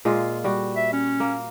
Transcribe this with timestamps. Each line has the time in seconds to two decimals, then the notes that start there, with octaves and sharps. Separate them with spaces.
0.05 A#2 G#3 F4
0.44 G3 F#4
0.76 E5
0.93 C#4
1.20 A#3